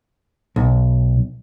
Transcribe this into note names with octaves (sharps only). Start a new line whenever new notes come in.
B1